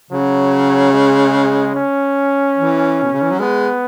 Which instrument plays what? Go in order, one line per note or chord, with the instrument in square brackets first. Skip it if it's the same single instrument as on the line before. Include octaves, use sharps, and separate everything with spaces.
[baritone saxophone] C#3 [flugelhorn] F#3
[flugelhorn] G#3
C#4
[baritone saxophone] E3
B2
C#3
E3
F#3
[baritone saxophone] G#3 [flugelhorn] B3